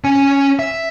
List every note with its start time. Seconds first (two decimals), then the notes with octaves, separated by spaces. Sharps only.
0.04 C#4 G#5
0.59 E5